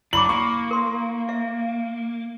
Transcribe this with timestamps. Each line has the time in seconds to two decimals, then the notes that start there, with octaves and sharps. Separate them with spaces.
0.13 F#3 D4 E4 B5 D6 F#7
0.29 A#3 C#6
0.71 A#4 C6
1.29 E5